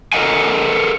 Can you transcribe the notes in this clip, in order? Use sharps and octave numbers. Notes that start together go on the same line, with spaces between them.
A4 A#4 C#5 D#5 F#5 G#5